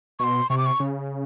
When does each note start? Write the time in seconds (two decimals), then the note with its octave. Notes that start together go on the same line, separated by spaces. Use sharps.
0.19 B2 C6 C#6
0.50 C3 C#6
0.58 D6
0.66 C#6
0.80 C#3